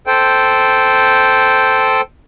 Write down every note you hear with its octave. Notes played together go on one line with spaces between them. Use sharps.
A4 C5 G5